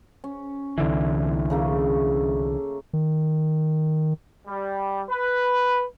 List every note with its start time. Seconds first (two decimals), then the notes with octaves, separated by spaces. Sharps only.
0.24 C#4
0.78 C2 D3 E3
1.50 C#3 A3 A#3
2.93 D#3
4.46 G3
5.09 B4